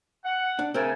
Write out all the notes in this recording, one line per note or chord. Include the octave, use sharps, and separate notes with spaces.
F#5
D4
C#3 A3 C4 A#4 G#5